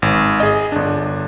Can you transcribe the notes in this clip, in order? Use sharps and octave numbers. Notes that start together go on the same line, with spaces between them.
G#1
G#4 D#5
G1 D4